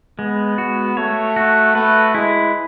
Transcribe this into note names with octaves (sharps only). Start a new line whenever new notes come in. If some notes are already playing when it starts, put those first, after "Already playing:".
G#3 B3
F#4
A3 C#5
F#4
A3 B4
G#3 E4